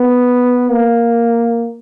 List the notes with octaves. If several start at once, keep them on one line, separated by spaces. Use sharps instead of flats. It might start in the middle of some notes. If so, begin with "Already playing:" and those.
Already playing: B3
A#3